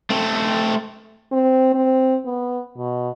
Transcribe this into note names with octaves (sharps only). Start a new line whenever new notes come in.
A3 C4
C4
C4
B3
B2